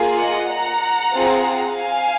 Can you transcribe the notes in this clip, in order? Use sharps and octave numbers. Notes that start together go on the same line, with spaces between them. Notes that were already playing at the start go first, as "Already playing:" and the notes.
Already playing: A#3 F4 G#4
D#5 F#5
F#5 A#5
C4 F4 G#4
F5 G#5